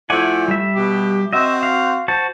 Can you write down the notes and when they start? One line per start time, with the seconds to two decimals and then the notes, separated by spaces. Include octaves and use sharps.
0.10 F3 A3 E4 D5 F#5 G#5
0.48 G3 E5
0.76 B2 G4
1.33 C4 F#4 D#5 E5
1.63 F5
2.08 F#4 C5 A5